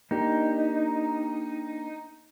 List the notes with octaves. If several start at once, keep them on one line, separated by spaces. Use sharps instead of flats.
A#3 D4 D#4 G4